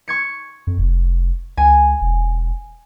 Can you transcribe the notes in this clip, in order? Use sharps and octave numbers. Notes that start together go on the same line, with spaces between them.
C#6 G#6 C#7
F2
F1
C#2 G#5
E1